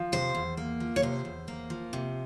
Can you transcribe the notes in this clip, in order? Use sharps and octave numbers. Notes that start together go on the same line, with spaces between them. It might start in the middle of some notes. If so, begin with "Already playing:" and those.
Already playing: F3
C3 C5
E2
A#3
F3
C#5
C3 C5
E2
A#3
F3
C3